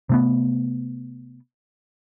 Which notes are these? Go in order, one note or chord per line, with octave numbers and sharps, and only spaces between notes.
C3 A3 B3